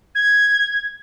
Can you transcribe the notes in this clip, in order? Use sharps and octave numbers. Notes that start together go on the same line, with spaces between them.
G#6